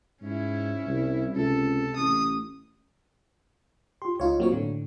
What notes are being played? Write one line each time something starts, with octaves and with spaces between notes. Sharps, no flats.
G#2 C#4 E4
C2
C#2 C3 A4
A1 D#6
F4 G4 C6
C#2 D#4 F4 C#5
F#3 A#3 C4 F4 C#5
A2 D3